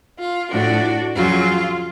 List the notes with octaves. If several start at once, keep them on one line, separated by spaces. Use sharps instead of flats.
F4
A2 F3 D4 F#4
F2 C#3 F#3 F4